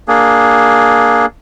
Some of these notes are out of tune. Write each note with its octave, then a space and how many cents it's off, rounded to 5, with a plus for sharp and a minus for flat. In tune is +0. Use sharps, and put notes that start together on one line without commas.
A#3 +0 D4 +0 G#4 +0